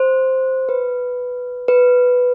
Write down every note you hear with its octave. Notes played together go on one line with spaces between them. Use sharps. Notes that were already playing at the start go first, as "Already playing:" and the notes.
Already playing: C5
B4
B4